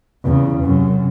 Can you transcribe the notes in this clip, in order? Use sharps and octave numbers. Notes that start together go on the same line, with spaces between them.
E2 C#3
F#2 C3